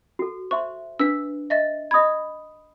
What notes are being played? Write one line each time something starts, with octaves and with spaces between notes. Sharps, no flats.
F#4 A4
C5 E5 C6 C#6
D4 B4 E6 B6
D#5 E5 A6
D#5 B5 D#6 G#6